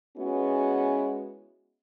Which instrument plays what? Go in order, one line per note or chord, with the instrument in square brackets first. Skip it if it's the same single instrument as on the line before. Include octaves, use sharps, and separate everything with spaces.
[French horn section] G#3 B3 C#4 E4 F#4